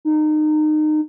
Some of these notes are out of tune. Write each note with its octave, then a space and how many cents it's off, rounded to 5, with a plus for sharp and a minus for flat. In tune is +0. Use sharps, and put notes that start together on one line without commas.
D#4 -25